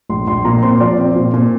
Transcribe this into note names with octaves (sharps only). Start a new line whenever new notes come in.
A#1 C6
A#1 C6
A#2 A#5
C4 C6
F3 D5
C4
A#2
A#2